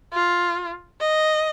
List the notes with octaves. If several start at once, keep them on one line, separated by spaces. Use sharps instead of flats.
F4
D#5